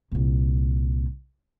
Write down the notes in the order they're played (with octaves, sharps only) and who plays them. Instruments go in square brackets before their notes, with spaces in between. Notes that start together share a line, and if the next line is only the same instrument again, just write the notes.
[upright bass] C2 A#2